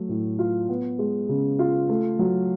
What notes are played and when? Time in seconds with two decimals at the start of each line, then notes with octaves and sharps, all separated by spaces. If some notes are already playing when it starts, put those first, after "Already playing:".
Already playing: F#3 A3
0.09 A2
0.39 F4
0.69 B3
0.99 G#3
1.29 C#3
1.59 F4
1.89 A3
2.19 F#3